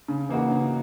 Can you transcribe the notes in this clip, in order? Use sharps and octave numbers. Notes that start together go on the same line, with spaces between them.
C#3
E3 A#3 D#4 F#4
C#3